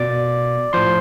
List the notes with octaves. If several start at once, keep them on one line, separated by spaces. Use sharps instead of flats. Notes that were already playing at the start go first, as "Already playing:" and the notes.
Already playing: B2 D5 D6
A2 F3 C5 C6